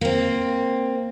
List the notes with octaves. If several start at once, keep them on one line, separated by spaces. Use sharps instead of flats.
A#3 C4